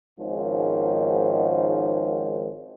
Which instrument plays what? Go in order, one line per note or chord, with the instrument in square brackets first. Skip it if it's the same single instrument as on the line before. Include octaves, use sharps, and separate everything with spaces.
[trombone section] G#1 G#2 D#3 F3 C#4